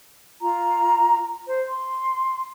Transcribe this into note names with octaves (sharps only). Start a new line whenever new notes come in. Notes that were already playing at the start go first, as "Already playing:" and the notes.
F4 A#5
C5
C6